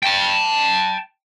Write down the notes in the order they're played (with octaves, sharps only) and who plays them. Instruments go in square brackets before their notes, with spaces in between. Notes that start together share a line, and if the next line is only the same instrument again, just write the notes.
[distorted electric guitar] G5 A5